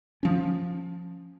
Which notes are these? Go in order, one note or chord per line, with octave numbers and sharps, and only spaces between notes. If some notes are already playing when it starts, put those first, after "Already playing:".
F3 C#4